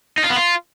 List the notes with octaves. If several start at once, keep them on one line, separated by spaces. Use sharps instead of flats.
D#4
F4
B3
F4